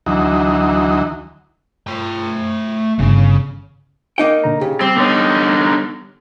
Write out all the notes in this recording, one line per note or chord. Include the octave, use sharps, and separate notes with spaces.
D2 E3 F#3 D#4
A3 G5
G1 C#3
A#3 D#4 G5
A#2 D3 A#5
C#3 G4
G3 C4
D3 B3 D#4 C#5